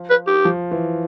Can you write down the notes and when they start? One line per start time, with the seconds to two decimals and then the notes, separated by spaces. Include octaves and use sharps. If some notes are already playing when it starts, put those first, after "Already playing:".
Already playing: F3
0.10 B4
0.27 G4
0.45 F3
0.71 E3